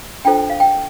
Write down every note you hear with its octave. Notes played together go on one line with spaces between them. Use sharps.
D4 F4 A4 C5 G5
F5
G5